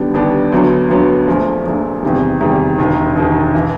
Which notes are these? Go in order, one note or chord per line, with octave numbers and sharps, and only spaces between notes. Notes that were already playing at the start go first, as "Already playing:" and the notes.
Already playing: D#2 D3 G3 B3 D4
D#2 D3 G3 B3 D4
D2 D3 F#3 B3
D2 D3 F#3 B3
A#1 A#2 F3 A3
A#1 A#2 F3 A3
E2 C3 D#3 G3
E2 C3 D#3 G3
E1 D#2 D#3
E1 D#2 D#3
E3